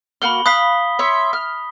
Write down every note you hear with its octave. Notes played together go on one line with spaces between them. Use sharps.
A#3 F#4 B5 F6 G7
F5 B5 D#6 F#6 B6
C#5 E5 C6
F6